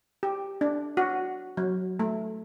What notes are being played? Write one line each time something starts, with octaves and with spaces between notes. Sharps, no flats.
G4
D4
F#4
F#3
A3